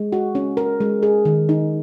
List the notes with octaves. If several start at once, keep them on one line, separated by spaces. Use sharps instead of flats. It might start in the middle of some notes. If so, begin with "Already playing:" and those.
Already playing: G#3
F#4
C#4
A#4
G#3
G#4
D#3
D#4